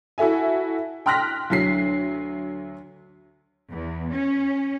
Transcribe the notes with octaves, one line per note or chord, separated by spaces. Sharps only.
E4 F#4 A4 E5 G#5
G5 C6 F6 F#6 A#6 B6
D2 F#3 B6 C7
E2
C#4